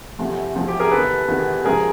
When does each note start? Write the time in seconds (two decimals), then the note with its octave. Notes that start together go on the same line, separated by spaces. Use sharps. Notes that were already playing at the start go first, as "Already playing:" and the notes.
0.18 E2 C3 F3 A3
0.55 E2 C3 F3 A3
0.68 G4
0.80 G#4 A#4
0.91 E2 C3 D#3 A4 B4
1.28 E2 C3 D#3
1.65 C#2 C3 F3 G#4 A#4